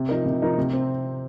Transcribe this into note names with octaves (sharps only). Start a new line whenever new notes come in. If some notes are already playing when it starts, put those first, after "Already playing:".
Already playing: C3
F3 D#4 A#4
C3
F3 D#4 A#4
C3
C4